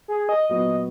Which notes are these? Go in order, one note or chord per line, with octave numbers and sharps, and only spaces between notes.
G#4
D#5
A#2 F#3 B3 F#4 D#5